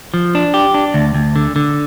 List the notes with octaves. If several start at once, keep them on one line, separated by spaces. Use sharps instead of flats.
F3
D4
G4
D4
D2
D2
D3
D3